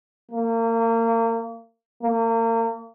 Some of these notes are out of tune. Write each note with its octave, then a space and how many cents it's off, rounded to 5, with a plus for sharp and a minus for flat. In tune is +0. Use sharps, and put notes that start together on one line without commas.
A#3 -30
A#3 -35